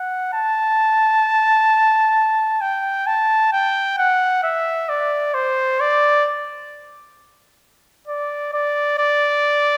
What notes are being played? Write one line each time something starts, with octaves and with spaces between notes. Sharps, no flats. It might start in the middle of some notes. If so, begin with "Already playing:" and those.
Already playing: F#5
A5
G5
A5
G5
F#5
E5
D5
C5
D5
D5
D5
D5